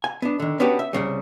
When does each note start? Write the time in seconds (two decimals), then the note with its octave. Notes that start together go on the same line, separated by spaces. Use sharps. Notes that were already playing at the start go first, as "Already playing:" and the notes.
0.04 G#5
0.22 B3 D4
0.40 D3 D#3
0.60 B3 C#4 D4 F#4 G4 B4
0.79 E5
0.93 C2 F#2 C#3 G3